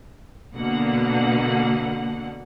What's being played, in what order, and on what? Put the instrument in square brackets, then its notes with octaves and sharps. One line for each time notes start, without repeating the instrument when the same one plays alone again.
[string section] B2 D3 A#3 F#5